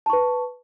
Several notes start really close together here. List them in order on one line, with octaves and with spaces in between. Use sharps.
A5 C#6 B4